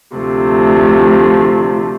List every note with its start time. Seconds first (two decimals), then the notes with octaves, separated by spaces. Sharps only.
0.15 D2 C3 F3 A3